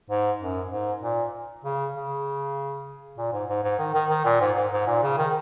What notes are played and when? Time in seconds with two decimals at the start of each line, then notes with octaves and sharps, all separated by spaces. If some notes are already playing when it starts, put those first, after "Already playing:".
0.10 G#2
0.40 F#2
0.71 G#2
1.02 A#2
1.64 C#3
1.95 C#3
3.18 A#2
3.33 G#2
3.49 G#2
3.64 G#2
3.79 D#3
3.94 D#3
4.10 D#3
4.25 A#2
4.41 G#2
4.57 G#2
4.72 G#2
4.87 A#2
5.03 C#3
5.17 D#3